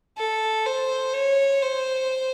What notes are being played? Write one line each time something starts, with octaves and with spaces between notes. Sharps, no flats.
A4
C5
C#5
C5